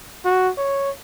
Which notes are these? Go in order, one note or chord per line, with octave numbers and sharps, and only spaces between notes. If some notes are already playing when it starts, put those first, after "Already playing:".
F#4
C#5